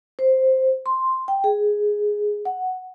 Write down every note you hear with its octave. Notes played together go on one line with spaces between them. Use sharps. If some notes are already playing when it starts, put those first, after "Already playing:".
C5
C6
G5
G#4
F#5